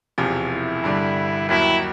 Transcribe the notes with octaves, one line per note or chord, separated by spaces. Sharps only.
E1 E2 C3 F3
E4
G2 D3 G3
D#2 D#3 F#3 E4